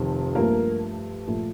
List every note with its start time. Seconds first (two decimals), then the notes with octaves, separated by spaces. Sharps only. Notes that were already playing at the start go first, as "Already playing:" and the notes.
Already playing: F1 F2 D#3
0.35 G2 F3 A3 A#3 A#4
1.27 A#2 F3 A3